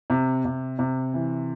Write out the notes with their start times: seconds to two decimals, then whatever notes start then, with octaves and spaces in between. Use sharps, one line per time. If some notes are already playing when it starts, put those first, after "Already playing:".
0.10 C3
0.45 C3
0.79 C3
1.14 E3